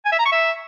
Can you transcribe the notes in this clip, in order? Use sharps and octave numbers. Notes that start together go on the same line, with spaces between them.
G#5
E5
A#5
C#6
E5